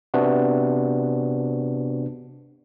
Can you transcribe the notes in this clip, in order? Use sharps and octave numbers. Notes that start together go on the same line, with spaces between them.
C3 B3 D4 F#4